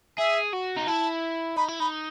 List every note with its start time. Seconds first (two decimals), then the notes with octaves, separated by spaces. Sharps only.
0.18 G#4 E5
0.53 F#4
0.77 D#4
0.87 E4 A5
1.57 D#4 B5
1.68 E4
1.80 D#4 B5